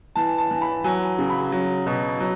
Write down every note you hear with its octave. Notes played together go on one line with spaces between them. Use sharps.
E3 A5
A5
E3
B5
F#3 G#5
C#3
B5
F#3
B2
F#3